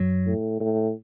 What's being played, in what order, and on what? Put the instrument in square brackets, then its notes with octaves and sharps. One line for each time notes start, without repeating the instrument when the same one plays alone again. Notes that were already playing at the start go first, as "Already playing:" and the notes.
Already playing: [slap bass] F#2 F#3
[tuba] A2
A2